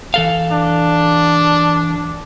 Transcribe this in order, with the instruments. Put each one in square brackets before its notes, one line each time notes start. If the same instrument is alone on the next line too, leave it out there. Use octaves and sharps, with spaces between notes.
[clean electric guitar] E3 A4 F5
[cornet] D4